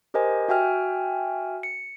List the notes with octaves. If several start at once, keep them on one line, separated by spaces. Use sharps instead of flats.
G4 A#4 C5 D#5 G#5
F#4 E5 G5 G#5 F6
C#7